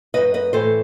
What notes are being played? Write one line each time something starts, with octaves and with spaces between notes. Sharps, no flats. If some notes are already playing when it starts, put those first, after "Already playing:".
F#2 D#3 B4 D#5
B4 D#5
A2 E3 A4 C5